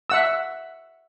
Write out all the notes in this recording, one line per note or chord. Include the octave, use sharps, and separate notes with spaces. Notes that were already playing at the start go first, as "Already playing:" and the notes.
E5 F#5 E6